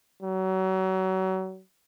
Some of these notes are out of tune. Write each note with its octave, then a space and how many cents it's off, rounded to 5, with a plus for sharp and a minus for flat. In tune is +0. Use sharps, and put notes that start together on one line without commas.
F#3 +30